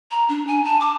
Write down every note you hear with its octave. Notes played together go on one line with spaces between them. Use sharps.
A#5
D4
G#5
A5
D6